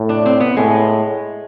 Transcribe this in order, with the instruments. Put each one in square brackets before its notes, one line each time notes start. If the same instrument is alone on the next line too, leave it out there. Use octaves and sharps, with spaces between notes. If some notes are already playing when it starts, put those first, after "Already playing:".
Already playing: [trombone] A2
[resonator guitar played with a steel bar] D4
C4
B3
[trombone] A2 [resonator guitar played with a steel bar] G#3